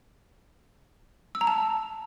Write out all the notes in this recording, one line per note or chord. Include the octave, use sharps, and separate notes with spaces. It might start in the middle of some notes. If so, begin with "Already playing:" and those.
E6
A#5
A5